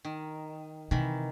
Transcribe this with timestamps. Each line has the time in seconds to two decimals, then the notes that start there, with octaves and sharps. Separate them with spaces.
0.05 D#3
0.91 C3 D#3 E3 B5